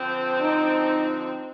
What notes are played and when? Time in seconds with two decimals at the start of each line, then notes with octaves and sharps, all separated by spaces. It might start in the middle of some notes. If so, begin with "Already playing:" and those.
Already playing: D3 F3 C4
0.41 D#4